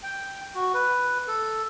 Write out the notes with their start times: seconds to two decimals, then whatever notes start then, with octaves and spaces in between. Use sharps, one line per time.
0.03 G5
0.55 F#4
0.74 B4
1.28 A4